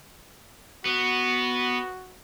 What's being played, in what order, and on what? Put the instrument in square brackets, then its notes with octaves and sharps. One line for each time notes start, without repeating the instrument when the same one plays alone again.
[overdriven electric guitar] B3 [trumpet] F#4